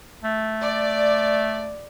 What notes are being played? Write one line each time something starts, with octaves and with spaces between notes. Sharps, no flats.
A3
D5